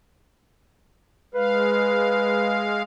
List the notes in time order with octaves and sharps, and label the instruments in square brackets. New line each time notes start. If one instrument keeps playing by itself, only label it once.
[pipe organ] G#3 F5 [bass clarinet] B4